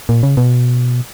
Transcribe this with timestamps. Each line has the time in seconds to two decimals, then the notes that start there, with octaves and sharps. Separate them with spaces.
0.09 A#2
0.23 C#3
0.37 B2